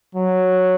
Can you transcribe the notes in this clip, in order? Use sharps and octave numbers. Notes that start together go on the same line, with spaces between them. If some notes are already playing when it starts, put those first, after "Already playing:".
F#3